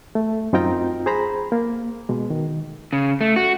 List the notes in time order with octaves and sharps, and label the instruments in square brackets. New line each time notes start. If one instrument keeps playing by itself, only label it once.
[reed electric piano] A3
F#2 C4 D#4 F4 G5 A#5
G#4 C5 A#5 B5
A#3
B2 G#3
D#3
[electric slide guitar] C#3
A3
F#4